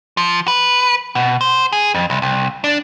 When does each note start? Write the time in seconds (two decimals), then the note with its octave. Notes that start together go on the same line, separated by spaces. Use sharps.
0.17 F3
0.48 B4
1.15 B2
1.41 C5
1.73 G#4
1.94 F2
2.10 C2
2.22 C2
2.64 D4